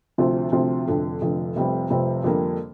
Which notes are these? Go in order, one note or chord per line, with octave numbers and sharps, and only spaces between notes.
D2 C3 F3 C4 F4
D2 C3 F3 C4 F4
F1 F2 D3
F1 F2 D3
F1 F2 C3 G3 C4
F1 F2 C3 G3 C4
F2 D3 G3 A#3